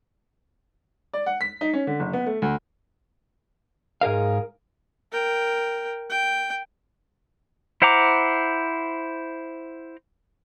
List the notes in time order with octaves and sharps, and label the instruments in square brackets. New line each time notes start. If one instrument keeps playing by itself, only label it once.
[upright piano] D5
F#5
B6
D#4
C#4
D3
F#1
B3
A3
D2
[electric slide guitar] G#2 G#4 A#4 F5
[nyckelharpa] A#4 G5
G5
[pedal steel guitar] E4 C5 F#5 A#5 D6